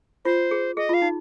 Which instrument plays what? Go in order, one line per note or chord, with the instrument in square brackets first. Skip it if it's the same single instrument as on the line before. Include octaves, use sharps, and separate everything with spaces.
[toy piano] F4 [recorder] C5
[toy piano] G#4
[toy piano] G#4 [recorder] D#5
[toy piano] F4 [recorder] F5
[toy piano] D#4